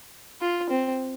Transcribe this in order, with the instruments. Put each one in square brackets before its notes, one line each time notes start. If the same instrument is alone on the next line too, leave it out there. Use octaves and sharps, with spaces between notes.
[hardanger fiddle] F4
C4